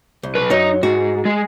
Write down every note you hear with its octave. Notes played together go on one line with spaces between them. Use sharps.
C2
B1 B4
F#2 F#3 D#4
G#2 F#4
G#3